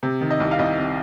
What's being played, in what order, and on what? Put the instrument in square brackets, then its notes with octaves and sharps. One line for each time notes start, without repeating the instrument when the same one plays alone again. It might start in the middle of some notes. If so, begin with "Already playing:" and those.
[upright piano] C3
D#3
D#5
C2
F5
C2 D#5
C3